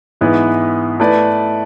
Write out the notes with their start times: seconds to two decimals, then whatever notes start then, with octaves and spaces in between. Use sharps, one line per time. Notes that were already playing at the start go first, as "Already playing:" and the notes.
0.21 G#2 E3 B3 E4 B4
1.00 A3 E4 B4 D5